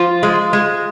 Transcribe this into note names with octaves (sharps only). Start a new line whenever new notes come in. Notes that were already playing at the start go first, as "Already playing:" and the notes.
Already playing: F3 F4
G#3
G#3